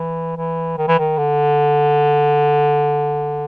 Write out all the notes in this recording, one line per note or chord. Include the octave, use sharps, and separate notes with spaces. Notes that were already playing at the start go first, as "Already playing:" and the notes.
Already playing: E3
E3
D#3
E3
D#3
D3